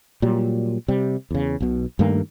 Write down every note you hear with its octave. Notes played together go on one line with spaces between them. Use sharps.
A#2 F#3 G3
C3 G3
E2 C#3
B1 B2
G2 D#3 A3 A#3